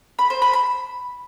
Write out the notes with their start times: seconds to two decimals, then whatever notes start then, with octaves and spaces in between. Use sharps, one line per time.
0.19 B5
0.30 C5
0.42 B5
0.53 B5